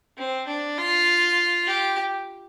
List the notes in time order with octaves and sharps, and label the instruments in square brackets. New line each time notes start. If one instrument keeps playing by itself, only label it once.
[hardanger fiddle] C4
D4
F4
G4